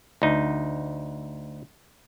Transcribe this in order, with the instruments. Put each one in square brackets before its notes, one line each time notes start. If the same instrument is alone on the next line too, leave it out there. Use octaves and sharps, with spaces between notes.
[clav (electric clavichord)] D2 D#4